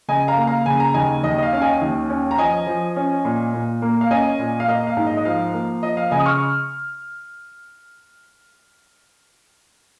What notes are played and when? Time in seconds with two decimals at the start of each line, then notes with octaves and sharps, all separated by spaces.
0.08 C#3 D#5 G#5
0.28 F5 A#5
0.37 A#3
0.47 F5 A#5
0.66 C#3 G#5
0.80 A#5
0.94 D#2 D#5 G#5
1.23 D#2 D#5
1.38 D#5
1.43 F5
1.53 C#4 F5
1.61 D#5 G#5
1.81 D#2
2.10 C#4
2.31 A#5
2.38 F3 D#5 G#5
2.67 F3
2.96 C#4
3.25 A#2
3.54 A#2
3.82 A#3
4.01 F5
4.11 C#4 D#5 G#5
4.39 A#2
4.60 F5
4.68 A#3 D#5
4.87 F5
4.97 G#2
5.07 D#5
5.17 D#5
5.25 F3 F5
5.54 A#3
5.83 F3 D#5
5.97 F5
6.11 C#3 D#5 G#5
6.19 D#6
6.26 C#6 F6